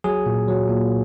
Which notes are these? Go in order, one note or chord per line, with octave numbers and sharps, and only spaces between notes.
F#3 G#4
A#2
F#3
A#2